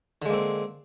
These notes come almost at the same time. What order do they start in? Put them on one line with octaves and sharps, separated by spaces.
D3 G#3 A#3 C4